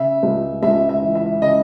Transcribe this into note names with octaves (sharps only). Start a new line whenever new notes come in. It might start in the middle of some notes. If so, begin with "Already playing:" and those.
Already playing: C#3 E5
C#2
C#2 E5
E5
E3
E5
C#3 D#5